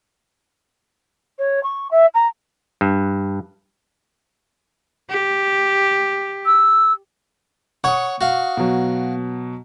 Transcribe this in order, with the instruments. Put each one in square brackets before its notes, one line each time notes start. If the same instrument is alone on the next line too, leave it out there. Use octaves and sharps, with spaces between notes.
[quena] C#5
C#6
E5
A#5
[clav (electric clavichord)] G2
[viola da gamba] G4
[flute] E6
[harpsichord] C#5 F#5 [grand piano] C#6 D#6
[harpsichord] F#4 F5
[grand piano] B2 F#3